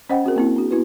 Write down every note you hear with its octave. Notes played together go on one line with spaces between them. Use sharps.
C#4 C5 D#5 F#5 G5 B5
C4 F#4 G#4 A#4
A#3 C4 E4
D4 F#4 G#4
B3 E4 F#4 B4